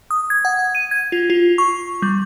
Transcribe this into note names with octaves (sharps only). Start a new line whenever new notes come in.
D#6
G#6
F#5
D#7
G#6
F4
F4
C#6
G3